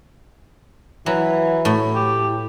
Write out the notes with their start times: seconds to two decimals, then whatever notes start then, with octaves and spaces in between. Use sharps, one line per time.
1.06 E3 F#3
1.65 A2
1.95 G4